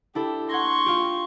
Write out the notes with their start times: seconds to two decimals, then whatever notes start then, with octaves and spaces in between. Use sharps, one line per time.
0.15 D4 E4 G4 A4
0.49 F#5 C6 C#6 G#6 A#6
0.86 F4 G4